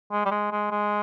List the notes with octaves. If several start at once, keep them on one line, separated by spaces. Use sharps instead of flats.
G#3
G3
G#3
G#3
G#3